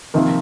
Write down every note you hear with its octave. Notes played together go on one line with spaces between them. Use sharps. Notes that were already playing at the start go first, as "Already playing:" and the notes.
C3 D#3 F3 A#3